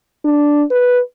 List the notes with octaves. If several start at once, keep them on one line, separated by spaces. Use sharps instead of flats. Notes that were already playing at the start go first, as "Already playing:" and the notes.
D4
B4